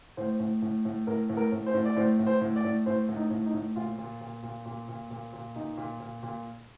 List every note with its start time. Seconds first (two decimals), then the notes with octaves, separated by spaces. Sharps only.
0.17 A2 C5
0.40 A2
0.62 A2
0.85 A2
1.07 A2 A#4
1.29 A2
1.37 A#4
1.52 A2
1.66 C5
1.74 A2
1.85 D5
1.96 A2 C5
2.19 A2
2.27 C5
2.41 A2
2.56 D5
2.64 A2
2.86 A2 C5
3.09 A2
3.16 D#4
3.31 A2
3.46 D#4
3.54 A2
3.76 A#2 F4
3.98 A#2
4.21 A#2
4.43 A#2
4.65 A#2
4.88 A#2
5.11 A#2
5.33 A#2
5.56 A#2 D#4
5.78 A#2
6.00 A#2
6.23 A#2